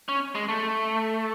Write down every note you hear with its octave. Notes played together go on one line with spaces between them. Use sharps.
C#4
G#3
A3